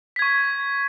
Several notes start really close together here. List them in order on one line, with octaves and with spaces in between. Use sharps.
B6 G#6 C#6